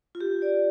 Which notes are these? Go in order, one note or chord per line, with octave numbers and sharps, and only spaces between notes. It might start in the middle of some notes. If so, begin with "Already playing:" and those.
F4
G4
D5